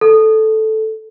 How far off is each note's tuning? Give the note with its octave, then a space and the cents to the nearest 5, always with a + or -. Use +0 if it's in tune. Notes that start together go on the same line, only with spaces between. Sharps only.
A4 -5